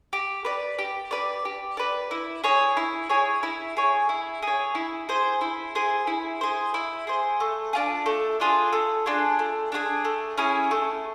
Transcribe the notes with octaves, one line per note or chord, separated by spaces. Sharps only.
G4
B4 D5
G4
B4 D5
G4
B4 D5
E4
G#4 C#5
E4
G#4 C#5
E4
G#4 C#5
E4
G#4 C#5
E4
G#4 C5
E4
G#4 C5
E4
G#4 C5
E4
G#4 C5
A3
D4 F4 G#4
A3
D4 F4 G#4
A3
D4 F4 G#4
A3
D4 F4 G#4
A3
C#4 E4 G#4
A3